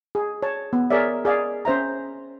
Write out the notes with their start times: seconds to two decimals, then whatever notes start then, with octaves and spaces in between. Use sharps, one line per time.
0.15 G#4
0.43 C#5 A5
0.73 B3
0.90 G#4 A#4 C#5 D5 E5
1.25 G#4 D5 F5
1.65 C#4 C5 E5 A#5